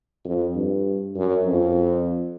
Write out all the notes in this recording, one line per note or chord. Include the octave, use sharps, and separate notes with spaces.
F2
G2
F#2
F2